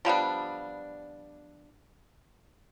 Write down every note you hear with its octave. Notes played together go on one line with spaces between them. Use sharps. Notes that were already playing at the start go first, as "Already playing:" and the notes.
F3 G3 B3 D4